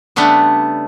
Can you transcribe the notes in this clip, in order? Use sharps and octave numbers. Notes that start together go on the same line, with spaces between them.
C#3 G3 A3 B3 D4